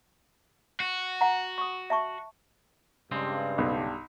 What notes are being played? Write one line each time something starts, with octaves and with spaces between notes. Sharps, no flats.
F#4
F#5 A#5
C#6 D#6
E5 A5 C#6
G2 C#3 G#3 C4
B1